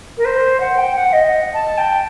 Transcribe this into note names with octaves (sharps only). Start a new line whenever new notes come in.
A#4
C5
F#5
G5
F#5
D#5
A5
G5